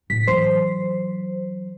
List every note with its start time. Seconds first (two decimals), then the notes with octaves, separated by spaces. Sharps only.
0.10 A2 B6
0.27 E3 F#3 C5